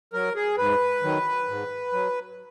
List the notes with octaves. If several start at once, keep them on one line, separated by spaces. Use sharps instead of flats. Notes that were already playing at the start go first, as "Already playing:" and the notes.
F#3 A#4
G#4
G#2 B4
D#3 F#3
G#2
F#3